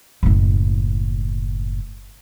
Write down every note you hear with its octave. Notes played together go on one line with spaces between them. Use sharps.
F#1 A2